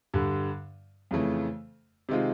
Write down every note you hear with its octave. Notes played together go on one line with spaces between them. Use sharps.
G2 D3 G3
F2 C#3 E3 A3
C3 D#3 G#3 C4 F4